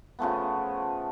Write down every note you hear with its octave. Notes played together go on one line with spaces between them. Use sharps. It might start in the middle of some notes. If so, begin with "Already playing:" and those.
C#3 F3 A3 B3